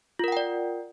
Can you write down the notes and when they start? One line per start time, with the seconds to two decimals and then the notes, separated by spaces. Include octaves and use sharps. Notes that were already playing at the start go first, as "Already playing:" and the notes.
0.19 F4
0.24 A#4
0.28 F#5
0.32 G5
0.37 D5